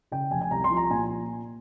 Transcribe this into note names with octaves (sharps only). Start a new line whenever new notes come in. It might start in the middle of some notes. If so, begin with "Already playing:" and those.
C#3 G5
F1 G#5
G#5
C2 A#5
C6
F3
A#5
A#2 G#5